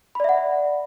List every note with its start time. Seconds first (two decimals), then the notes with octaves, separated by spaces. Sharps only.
0.15 B5
0.20 D5
0.24 E5
0.29 F#5